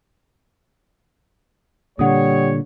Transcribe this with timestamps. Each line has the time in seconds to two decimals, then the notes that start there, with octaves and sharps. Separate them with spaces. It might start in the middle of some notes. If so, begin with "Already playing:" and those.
1.99 A#2 D3 G3 C#5 F#5 D#6